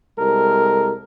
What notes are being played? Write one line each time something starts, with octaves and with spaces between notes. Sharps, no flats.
C2 G#3 A4 A#4